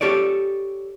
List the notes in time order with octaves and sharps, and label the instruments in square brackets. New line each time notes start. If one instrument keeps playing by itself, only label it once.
[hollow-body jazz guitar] G4 A4 C#5 D5